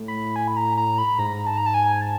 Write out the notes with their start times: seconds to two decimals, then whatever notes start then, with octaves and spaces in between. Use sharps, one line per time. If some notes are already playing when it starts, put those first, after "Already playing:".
Already playing: A2
0.08 B5
0.36 G#5
0.48 B5
0.57 A#5
0.78 A#5
0.98 B5
1.19 G#2 A#5
1.47 A5
1.58 A#5
1.66 A5
1.74 G#5
2.02 A5